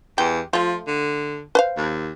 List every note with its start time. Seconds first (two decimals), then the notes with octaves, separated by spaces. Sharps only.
0.18 E2 G4
0.53 F3 A3 F4
0.87 D3
1.55 B4 C5 F5
1.77 D#2